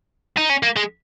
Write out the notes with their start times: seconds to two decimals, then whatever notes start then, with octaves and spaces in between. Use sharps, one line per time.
0.37 D#4
0.50 C#4
0.63 A#3
0.76 G#3